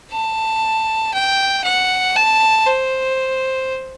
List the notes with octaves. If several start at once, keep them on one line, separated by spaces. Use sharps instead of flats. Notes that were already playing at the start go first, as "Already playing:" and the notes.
A5
G5
F#5
A5
C5